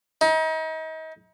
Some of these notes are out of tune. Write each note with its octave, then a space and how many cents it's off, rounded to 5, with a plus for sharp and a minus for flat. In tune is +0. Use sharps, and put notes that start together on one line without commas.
D#4 +35